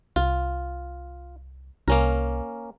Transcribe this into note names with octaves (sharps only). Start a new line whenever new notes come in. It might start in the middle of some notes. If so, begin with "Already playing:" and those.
C2 F4
C2 A#3 C#4 A#4